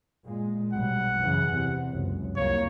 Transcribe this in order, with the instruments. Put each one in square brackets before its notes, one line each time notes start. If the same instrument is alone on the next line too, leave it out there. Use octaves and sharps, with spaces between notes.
[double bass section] A#2 G#3
[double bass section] B1 F2 G3 [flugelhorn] F#5
[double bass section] F#2 C#3 E3
E2 C3
F#1 C#2 F#2
[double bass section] C2 F2 A#3 [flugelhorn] C#5